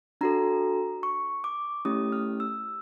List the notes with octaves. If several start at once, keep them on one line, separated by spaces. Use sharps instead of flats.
D4 F#4 A4 A#5
C#6
D6
A3 C#4 E4 G4 D#6
F6
E6